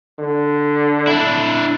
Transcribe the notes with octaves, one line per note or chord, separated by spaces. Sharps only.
D3
D4 E4